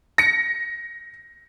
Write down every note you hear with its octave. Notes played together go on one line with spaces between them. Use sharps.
A#6 C#7